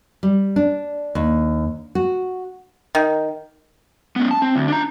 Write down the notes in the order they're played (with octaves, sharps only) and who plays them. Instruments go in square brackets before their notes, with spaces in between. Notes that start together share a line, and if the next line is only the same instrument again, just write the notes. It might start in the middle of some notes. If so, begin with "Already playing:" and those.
[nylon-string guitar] G3
D4
D#2
F#4
[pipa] D#3
[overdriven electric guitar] B3 C#4
A5
C4
D2
D4 A#5